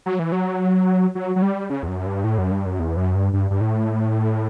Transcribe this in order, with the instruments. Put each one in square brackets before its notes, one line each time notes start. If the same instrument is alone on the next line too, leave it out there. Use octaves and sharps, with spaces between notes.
[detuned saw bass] F#3
E3
F#3
F#3
F#3
G3
C#3
E2
F#2
G2
A2
F#2
G2
F#2
E2
F#2
G2
G2
G2
A2